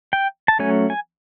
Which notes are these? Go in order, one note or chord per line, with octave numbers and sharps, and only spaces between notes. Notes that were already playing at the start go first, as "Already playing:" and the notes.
G5
A5
F#3 A3 C#4 G#5
G#5